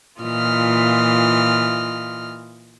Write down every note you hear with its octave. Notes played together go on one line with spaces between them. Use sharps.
A#2 E3 F4 D#5 F6